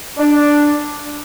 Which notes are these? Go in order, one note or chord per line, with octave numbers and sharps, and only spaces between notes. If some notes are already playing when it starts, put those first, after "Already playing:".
D4